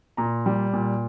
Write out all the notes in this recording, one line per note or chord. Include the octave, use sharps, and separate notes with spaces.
A#2 A#5
G3
A#2